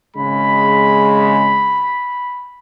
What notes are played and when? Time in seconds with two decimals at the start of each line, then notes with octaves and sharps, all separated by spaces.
0.16 G#1 C#3 G#3 B5